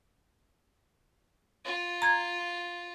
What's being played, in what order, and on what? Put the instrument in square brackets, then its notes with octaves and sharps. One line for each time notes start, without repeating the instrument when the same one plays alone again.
[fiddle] F4
[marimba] A#5 G#6